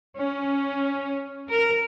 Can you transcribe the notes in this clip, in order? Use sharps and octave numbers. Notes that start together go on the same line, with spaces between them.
C#4
A#4